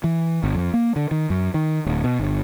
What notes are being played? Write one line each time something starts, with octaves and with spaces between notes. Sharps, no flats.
E3
G1
F2
A#3
D3
D#3
F#2
D#3
D1
B2
G1